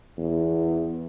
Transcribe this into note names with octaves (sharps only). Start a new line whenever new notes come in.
E2